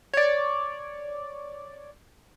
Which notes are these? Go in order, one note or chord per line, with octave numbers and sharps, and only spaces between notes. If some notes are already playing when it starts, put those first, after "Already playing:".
C#5 D5